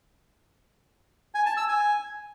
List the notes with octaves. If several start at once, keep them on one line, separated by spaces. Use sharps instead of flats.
G#5
A5
E6
G#5